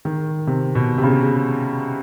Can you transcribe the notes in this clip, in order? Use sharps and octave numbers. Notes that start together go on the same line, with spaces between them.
D#3
C3
B2
C3
C#3